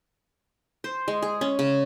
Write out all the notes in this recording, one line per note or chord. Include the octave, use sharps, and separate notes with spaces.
C5
G#3
G#4
C#4
C#3